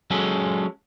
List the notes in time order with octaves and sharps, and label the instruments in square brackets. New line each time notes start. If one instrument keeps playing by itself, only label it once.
[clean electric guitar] F#3 G#3 C#4 G#4 A4